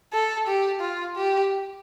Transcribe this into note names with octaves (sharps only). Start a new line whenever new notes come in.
A4
G4
F4
G4